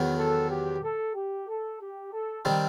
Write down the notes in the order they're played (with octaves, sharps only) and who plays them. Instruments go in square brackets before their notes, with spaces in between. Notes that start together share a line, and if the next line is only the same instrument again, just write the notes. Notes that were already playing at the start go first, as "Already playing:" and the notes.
Already playing: [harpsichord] E2 D#3 F#3 B3
[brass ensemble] A4
G4
A4
G4
A4
G4
A4
[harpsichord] D#3 G3 C4 D#4